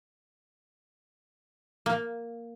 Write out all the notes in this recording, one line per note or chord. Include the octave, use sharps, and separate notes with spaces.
A#3